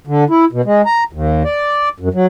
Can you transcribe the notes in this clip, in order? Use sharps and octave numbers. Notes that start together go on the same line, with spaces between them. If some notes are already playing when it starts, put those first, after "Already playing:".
D3
E4
B2
G#3
A#5
D#2
D5
F#2
F#3